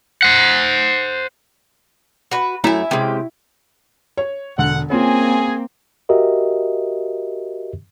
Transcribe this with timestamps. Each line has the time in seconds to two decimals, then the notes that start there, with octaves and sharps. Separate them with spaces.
0.22 C5 F#5
2.31 F#4 B4
2.64 F#2 A3 E4 E5 G#5 A#5
2.91 C3 G#3 C#4 G4
4.17 C#5
4.58 E1 D3 F#5
4.90 A#3 C4 C#4 F4 G#4 G#5
6.09 F#4 G4 A#4 D#5 E5